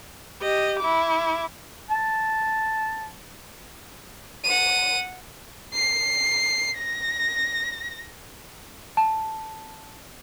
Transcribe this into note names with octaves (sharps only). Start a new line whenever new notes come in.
G4 D#5
E4 D6
A5
F#5 D#7
C7
A#6
A5